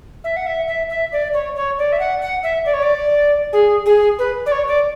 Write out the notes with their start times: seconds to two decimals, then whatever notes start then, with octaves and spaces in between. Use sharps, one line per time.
0.24 E5
0.36 F#5
0.46 E5
0.67 E5
0.89 E5
1.12 D5
1.33 C#5
1.55 C#5
1.78 D5
1.92 E5
1.99 F#5
2.21 F#5
2.43 E5
2.65 D5
2.73 C#5
2.82 D5
3.52 G#4
3.85 G#4
4.18 B4
4.46 D5
4.51 C#5
4.67 D5